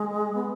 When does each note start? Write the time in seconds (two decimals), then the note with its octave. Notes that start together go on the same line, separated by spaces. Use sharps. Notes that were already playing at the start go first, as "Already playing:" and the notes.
Already playing: G#3
0.35 B3